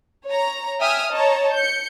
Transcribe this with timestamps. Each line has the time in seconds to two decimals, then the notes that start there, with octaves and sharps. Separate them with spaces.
0.25 C#5 A#5
0.79 E5 G5 G#5 D#6 F6
1.11 C#5 D#5 A5 A#5
1.53 G6 C#7